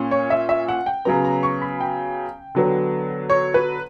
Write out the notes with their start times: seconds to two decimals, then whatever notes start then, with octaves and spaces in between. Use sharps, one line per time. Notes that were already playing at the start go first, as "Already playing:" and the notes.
Already playing: A#2 C#4
0.11 C#5
0.30 E5
0.49 E5
0.68 F#5
0.86 G5
1.05 C#3 F#3 B3 A#5
1.25 A#5
1.43 C#6
1.62 B5
1.81 G5
2.55 D3 F#3 B3
3.30 C#5
3.54 B4